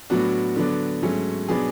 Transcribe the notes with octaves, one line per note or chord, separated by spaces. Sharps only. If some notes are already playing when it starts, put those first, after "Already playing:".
A2 F#3 B3 D4 F#4
D3 F#3 B3 D4
G#2 F#3 A3 C#4
B2 F#3 B3 D4 G#4